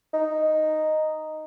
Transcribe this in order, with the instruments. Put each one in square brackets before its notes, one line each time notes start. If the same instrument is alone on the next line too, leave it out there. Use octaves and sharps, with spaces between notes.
[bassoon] D#4